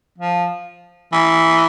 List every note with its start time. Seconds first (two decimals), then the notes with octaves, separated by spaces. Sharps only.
0.19 F3
1.12 E3